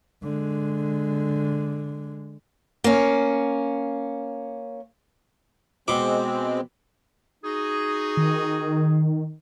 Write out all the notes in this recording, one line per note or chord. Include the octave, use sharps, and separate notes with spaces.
D3 G#3
A#3 C#4
B2 G#3 C4 D6
D#4 F#4 G#4
D#3